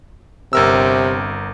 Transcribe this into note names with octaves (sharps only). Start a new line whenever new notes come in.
G1 C3 A#4 E6